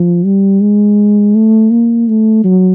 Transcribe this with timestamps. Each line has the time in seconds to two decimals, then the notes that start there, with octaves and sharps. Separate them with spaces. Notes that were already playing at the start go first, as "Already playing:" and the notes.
Already playing: F3
0.25 G3
0.61 G#3
1.35 A3
1.71 A#3
2.08 A3
2.45 F#3